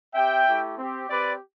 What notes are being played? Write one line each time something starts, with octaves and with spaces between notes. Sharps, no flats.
C4 G4 E5 G5
A3 E4 G4
C4 G4
C4 G4 B4 D5